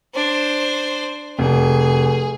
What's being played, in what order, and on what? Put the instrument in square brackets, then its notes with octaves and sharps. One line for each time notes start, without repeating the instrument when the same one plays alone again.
[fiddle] D4 C5
[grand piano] F1 [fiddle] G#4